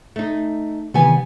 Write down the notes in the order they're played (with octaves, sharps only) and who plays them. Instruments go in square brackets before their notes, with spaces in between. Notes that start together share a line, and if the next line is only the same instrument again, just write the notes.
[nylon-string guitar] A3 D#4
[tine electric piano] C3 D#3 E3 [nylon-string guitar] G3 B3 G#5